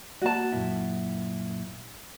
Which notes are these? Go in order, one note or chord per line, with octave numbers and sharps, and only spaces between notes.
A#3 F#4 D5 A5
F#2 A#2 E4